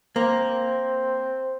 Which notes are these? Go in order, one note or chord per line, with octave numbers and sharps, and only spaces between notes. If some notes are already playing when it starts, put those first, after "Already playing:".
A#3 C4